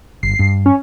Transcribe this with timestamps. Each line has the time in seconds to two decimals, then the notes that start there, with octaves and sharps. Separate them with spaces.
0.23 G1 C7
0.39 G2
0.66 C#4